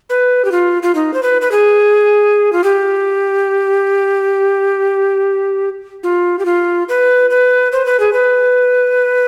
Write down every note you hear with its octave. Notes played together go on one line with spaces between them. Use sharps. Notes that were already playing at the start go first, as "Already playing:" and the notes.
B4
G4
F4
F4
D#4
C5
B4
B4
G#4
F4
G4
F4
G4
F4
B4
B4
C5
B4
G#4
B4